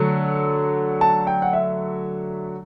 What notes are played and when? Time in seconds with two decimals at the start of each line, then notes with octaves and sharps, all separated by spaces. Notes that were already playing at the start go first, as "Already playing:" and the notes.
Already playing: D3 F#3 A3
1.01 A5
1.27 G5
1.42 F#5
1.53 E5